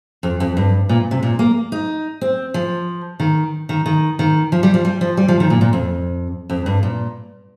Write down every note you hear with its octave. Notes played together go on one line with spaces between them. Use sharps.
F2
F2
G2
A#2
C3
A#2
A#3
D#4
C4
F3
D#3
D#3
D#3
D#3
F3
G3
F3
G3
F3
G3
F3
D#3
A#2
A#2
F2
F2
G2
A#2